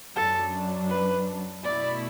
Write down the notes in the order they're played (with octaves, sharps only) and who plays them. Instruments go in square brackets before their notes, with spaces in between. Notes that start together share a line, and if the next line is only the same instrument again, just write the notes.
[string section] F#2 F#3 D4 [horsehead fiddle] A4
[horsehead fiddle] B4
[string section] B2 A3 E4 [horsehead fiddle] D5